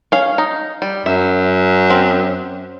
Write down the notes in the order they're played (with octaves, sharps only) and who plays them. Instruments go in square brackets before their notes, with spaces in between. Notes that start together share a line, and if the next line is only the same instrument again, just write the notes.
[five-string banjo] C#4 F5
D#4
G3
[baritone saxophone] F#2 [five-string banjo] E5
[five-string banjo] C4